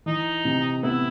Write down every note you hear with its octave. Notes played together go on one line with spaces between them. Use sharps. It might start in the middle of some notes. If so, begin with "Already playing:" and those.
E3 D#4
C3
B3 E4